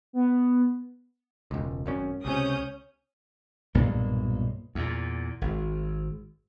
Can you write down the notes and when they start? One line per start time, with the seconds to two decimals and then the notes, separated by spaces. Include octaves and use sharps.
0.13 B3
1.51 E1 C#2
1.86 G#1 F#2 C#4
2.25 C#2 C3 C#4 D#6 G6
3.75 B1 G2 A#2 A#3
4.75 E2 A#2
5.41 G#1